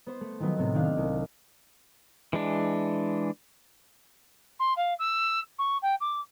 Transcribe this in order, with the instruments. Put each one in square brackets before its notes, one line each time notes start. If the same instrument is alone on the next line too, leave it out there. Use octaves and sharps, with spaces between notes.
[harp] B3 C5
A3
D#3 F3 F#3 B3
A2 C3 B3 C4
D#3 D4 F5
C2
[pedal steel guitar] E3 G#3 D4
[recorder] C6
F5
E6
C#6
G5
D6